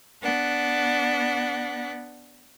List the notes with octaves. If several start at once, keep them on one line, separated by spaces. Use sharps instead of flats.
B3 D4 F#5